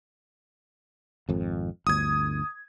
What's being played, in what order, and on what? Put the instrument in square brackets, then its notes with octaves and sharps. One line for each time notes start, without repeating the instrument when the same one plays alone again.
[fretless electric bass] G#1 F2
[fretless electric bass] G1 D2 [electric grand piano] D#6 G#6